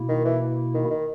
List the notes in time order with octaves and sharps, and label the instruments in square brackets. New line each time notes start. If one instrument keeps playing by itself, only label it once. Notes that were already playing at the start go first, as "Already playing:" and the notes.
Already playing: [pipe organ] B2 A#3 E4
[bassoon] D#3
E3
D#3
D#3